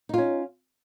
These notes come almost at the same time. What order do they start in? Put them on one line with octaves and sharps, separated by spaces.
D#4 F4 C#4